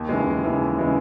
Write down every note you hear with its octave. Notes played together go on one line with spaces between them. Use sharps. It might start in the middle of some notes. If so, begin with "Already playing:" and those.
Already playing: D#2
C#3 E3 G#3
D#2
C#3 E3 G#3
D#2
C#3 E3 G#3